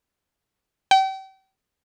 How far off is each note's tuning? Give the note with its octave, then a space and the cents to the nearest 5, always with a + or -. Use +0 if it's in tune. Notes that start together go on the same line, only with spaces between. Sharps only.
G5 -35